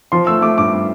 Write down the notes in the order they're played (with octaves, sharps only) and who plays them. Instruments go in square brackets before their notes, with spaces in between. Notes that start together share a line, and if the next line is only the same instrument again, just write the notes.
[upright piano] F3 C6
A3 E6
A3 D6
G2 D6